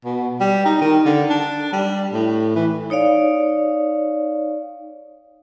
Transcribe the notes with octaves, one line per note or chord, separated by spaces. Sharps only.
B2
G3
D#4
D#3
D3
D4
G3
A2
E3
D#4 C#5 D5 F5